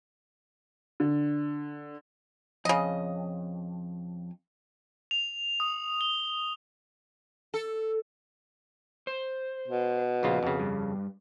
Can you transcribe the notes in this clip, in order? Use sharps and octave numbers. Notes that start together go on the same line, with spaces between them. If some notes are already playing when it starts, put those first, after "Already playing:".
D3
F2 C#3 D#5
F7
D#6
G7
A4
C5
B2
A#1 C#3 F4
F2 C#3
G2